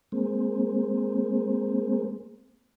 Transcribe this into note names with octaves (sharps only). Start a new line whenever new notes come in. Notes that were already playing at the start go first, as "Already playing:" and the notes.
G#3 A#3 C4